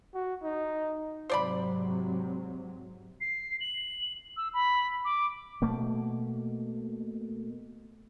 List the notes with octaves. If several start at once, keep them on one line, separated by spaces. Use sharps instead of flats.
F#4
D#4
G#2 C3 F#3 C5 D5 B5
C7
F#7
E6
B5
D6
B2 A3 A#3